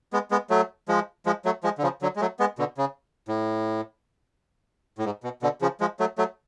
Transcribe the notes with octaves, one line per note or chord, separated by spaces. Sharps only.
G#3 B3
G#3 B3
F#3 A3
F3 G#3
F3 G#3
F#3 A3
F3 G#3
D3
C#3 F3
D3 F#3
G#3
F#3 A3
G#3 B3
B2 D3
C#3
A2
A2
G#2
B2
B2 D3
C#3 F3
F3 G#3
F#3 A3
F#3 A3